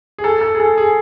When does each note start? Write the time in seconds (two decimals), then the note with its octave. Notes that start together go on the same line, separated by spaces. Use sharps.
0.18 G#4
0.24 A4
0.41 A4
0.54 G#4
0.60 A4
0.78 G#4